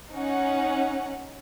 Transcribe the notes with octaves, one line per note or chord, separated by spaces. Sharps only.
C#4 D#4 F#5